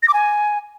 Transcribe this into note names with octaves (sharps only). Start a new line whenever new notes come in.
A#6
D6
G#5